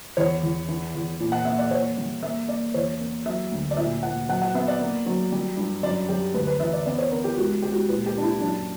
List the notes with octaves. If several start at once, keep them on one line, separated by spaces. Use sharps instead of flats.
E2 C#5
E2
E3
E2
A#2
F#5
A#3 E5
D5
A#3 C#5
G3
A#3 E5
A#3 D5
E2 C#5
A#3
F#3 E5
D2
D5
A#2 E5
A#2 F#5
F#3 F#5
F#5
B3 E5
D5
A#3
F#3
G3
G2
F#2 D5
F#2 G4
D2 B4
B4
E3 E5
D5
B3 D5
C#5
B3 A#4
G4
C#2 F#4
C#2 G4
F#4
A#2 B4
G4
A#3 D4
E4
F#2 D4